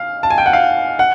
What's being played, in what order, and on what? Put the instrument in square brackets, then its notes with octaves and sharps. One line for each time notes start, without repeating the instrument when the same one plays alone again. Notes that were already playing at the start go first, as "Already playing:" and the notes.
Already playing: [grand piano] F5
A5
G#5
G5
F#5
F5
F#5